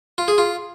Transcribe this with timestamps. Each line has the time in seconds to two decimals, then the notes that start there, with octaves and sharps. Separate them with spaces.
0.18 F4
0.28 G#4
0.38 F4